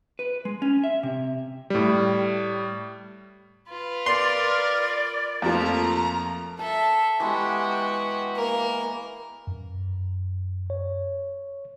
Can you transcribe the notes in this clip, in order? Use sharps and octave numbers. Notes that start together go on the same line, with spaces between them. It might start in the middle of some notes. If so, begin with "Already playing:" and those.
B4
G#3
C#4
E5
C3
A2 G3
F4 B4
A#4 D5 C6
F2 F3 A3 A#3 A#5
A4 E5 A5
E3 G#3 B3 F#4 G4
A#3 A#4
F#2
C#5